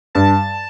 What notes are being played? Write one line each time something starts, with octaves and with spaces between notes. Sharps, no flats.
G2 A5